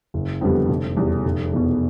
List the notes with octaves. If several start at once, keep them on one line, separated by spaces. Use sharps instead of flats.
F#1
F2 D3 G3 B3
F1
E2 B2 G3
F1
E2 B2